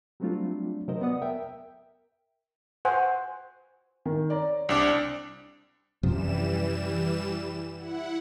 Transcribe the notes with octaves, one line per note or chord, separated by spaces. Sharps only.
F#3 G3 A3 C4 D4 F4
C3 F#3 A#4 C5 D#5
B3 D5 F#5 D#6
A#4 E5 G5
C5 F#5 G#5
D#3
C#5 D5 A#5
C2 C4 D4 D6
F#2 C3 E3 F3 G3 E7
E4 F#5